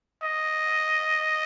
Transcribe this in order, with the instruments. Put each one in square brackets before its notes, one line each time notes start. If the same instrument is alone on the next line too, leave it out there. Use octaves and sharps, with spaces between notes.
[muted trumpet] D#5